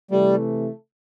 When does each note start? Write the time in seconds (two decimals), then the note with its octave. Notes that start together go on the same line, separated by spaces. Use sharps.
0.11 C3 E3 G3 A3